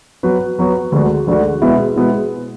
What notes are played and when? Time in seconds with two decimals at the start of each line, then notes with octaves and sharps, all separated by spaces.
0.23 F#3 B3 F#4 B4
0.59 F#3 B3 F#4 B4
0.92 D2 D3 G#3 D4 F#4
1.27 D2 D3 G#3 D4 F#4
1.62 B2 G#3 B3 E4
1.96 B2 G#3 B3 E4